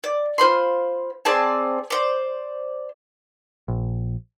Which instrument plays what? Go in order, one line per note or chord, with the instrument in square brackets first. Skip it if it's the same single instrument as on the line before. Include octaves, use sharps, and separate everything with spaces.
[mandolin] D5
F4 C5 B5 C6
C4 G#4 D5 A5
C5 D5
[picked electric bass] A#1